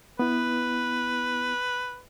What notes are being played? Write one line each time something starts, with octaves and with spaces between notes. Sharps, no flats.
B3 E4 B4